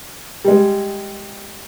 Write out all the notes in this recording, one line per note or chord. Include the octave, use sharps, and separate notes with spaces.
G3 G#3